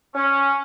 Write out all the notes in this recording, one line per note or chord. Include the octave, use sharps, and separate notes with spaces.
C#4